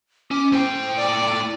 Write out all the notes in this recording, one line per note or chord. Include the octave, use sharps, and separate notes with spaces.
C#4 D6
A2 C5 G5
D5